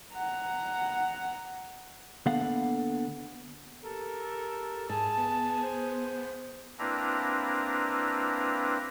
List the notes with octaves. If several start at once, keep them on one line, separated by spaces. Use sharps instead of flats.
F#5 A#5
D3 A#3 B3 A4 F5 F#5
G4 A4 A#4
G#2 G#4 A5
B3
C5
A#3 C4 D4 E4 B4 A#5